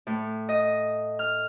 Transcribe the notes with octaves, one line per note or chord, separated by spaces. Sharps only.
A2
D#5
F6